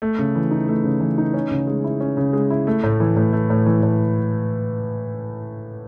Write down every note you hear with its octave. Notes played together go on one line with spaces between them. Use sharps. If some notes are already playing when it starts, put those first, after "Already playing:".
A3
C#3
E3
D#4
A3
C#3
E3
D#4
C#4
C#3
G#3
E4
C#4
C#3
G#3
E4
A3
A2
E3
A2
A3
A2
E3
A2